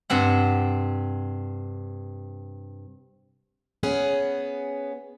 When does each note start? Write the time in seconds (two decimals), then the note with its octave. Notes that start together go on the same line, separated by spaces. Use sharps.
0.10 G2 C3 C4 F#5
3.83 B3 C#4 G#4 F#5